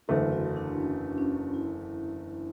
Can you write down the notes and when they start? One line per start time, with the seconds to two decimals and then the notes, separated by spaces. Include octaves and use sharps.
0.08 F#1 E2 D3 A3 D4 F#4
0.32 E4
0.56 D4
0.81 C#4
1.18 C#4
1.54 E4